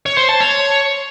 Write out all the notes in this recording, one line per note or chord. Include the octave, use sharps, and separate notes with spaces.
C#5
C5
A5
C#5